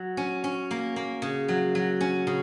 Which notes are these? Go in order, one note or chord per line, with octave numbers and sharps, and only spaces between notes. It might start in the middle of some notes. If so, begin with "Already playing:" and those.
Already playing: F#3
C#4
C#4
A#3
A#3
C#3
F#3
F#3
C#4
C#3